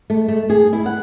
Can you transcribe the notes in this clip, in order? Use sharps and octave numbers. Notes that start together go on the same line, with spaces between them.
A3
A3
G#4
E4
F#5